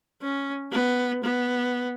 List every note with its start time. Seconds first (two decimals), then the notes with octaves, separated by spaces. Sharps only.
0.22 C#4
0.72 B3
1.23 B3